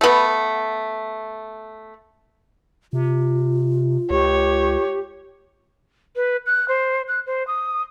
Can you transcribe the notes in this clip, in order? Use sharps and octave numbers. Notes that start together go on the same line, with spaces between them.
A3 B3
C3 F4
C#2 G4 C#5
B4
F#6
C5
F#6
C5
D#6